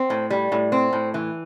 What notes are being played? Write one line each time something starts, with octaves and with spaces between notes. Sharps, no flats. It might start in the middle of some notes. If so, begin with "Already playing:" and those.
Already playing: C4
A2
G3
A2
C4
A2
E3